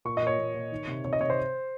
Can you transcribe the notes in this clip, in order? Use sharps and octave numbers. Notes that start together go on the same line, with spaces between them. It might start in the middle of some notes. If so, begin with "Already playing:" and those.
A#2 C#6
D#5
A#2 C#5
A#2
A#2
D#3
C3
C3 C#5
D#5
C3 C#5
C5